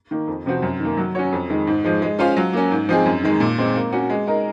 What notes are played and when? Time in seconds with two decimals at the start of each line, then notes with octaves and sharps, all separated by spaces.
0.11 D#3 A#3
0.28 F2
0.46 C3 F3 C4 F#4
0.62 F#2
0.80 D#3
0.85 A#3
0.97 F#3
1.15 C#4 F#4 C#5
1.32 F2
1.50 D#3 G#3
1.67 G#2
1.84 F3 G#3
2.02 G#3
2.19 C#4 F4 C5 F5
2.37 F#3
2.53 A#3 C#4
2.71 G#2
2.89 F3 C4 D#4 G#4
3.06 F#2
3.24 D#3 G#3 D#4
3.40 A#2
3.58 G#3 C4
3.76 A#3
3.92 C#4 F#4
4.10 G#3
4.27 D#4 A#4 D#5